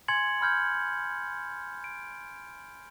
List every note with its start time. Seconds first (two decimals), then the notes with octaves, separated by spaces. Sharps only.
0.08 G#5 C6 G#6 A6 C#7 F#7
0.41 B5 F6 G6 G#6
1.84 D7